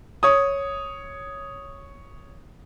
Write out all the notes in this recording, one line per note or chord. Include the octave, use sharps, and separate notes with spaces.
C#5 D#6